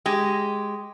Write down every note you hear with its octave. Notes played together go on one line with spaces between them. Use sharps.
G#3 G4